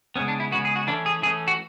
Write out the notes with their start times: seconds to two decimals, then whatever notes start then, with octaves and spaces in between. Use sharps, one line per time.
0.16 C#3 G#3 B3 C#4
0.28 D4
0.40 E4
0.52 C#3 G#3 B3 F#4
0.65 G#4
0.76 F#4
0.87 E3 A3 C#4 D4
1.06 G#4
1.23 E3 A3 C#4 G#4
1.48 F#4